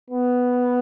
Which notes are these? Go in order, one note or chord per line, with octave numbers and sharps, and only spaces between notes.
B3